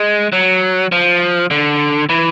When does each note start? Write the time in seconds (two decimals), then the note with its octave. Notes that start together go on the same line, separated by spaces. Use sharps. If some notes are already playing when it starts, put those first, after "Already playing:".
Already playing: G#3
0.33 F#3
0.92 F3
1.51 D3
2.09 E3